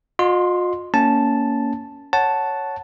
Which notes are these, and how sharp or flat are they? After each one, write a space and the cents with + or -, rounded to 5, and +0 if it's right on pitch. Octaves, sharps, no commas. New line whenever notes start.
F4 +45 D#5 -20 C6 +0
A#3 -10 C#4 +15 A5 +0
C#5 +0 F#5 +5 A5 +0